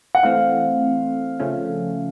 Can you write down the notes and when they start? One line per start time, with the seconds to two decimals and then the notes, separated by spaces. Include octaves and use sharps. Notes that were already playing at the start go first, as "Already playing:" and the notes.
0.15 F#5
0.23 E3 A3 C4 F5
1.40 C#3 F3 A3 C#4